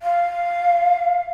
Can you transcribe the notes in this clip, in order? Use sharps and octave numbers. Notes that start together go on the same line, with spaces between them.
F5